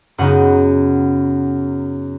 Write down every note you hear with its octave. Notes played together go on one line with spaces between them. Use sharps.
F#2 C#3 B3 D#4 F#5